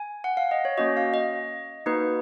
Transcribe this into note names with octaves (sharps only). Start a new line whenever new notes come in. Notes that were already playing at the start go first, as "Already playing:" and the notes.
Already playing: G#5
F#5
F5
D#5
C#5
A#3 C#4 F#4 D#5
F5
D#5
A#3 D#4 F#4 B4